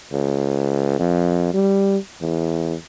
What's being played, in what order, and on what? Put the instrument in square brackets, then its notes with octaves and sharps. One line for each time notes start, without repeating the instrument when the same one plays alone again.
[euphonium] C#2
F2
G3
E2